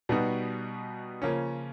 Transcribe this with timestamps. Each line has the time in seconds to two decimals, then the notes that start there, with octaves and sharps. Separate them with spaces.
0.09 B2 G3 B3 D#4 F#4
1.22 C#3 F3 A#3 C#4